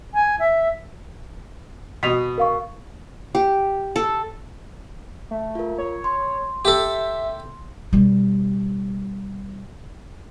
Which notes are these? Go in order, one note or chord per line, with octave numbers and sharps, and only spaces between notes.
G#5
E5
B2 D#5 B6 F7
A#4 F5 C#6
G4
A4
A3
F4 A#4
C#5
C6
G4 A4 E5
B2 G3